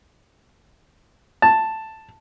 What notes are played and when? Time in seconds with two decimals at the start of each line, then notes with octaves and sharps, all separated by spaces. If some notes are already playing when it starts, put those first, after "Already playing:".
1.42 A5